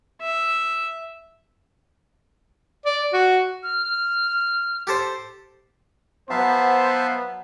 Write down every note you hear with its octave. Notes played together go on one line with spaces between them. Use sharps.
E5
D5
F#4
F6
G4 A4 C5
F#3 B3 C5 E5 F5 A5